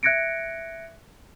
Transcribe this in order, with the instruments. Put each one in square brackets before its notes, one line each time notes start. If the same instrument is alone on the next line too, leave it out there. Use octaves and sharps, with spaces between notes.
[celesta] E5 F#6 G#6 A#6 C#7 D7